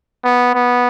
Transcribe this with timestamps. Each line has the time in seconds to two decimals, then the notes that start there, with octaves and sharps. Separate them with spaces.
0.24 B3
0.54 B3